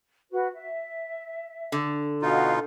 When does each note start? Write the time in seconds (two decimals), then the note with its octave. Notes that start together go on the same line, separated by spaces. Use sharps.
0.31 F#4 B4
0.54 E5
1.72 D3
2.22 B2 D#4 F4 F#4 F5